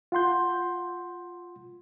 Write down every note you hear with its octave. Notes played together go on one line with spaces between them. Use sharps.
F4 F#5 C6 G6